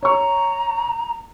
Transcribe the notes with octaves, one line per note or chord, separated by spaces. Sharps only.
C#5 A#5 C#6